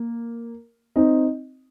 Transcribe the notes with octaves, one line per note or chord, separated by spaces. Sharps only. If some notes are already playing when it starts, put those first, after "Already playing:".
Already playing: A#3
C4 D#4